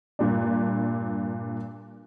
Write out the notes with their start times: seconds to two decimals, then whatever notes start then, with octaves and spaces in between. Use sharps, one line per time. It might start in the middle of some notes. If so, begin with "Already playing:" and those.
0.19 G2 A#2 D4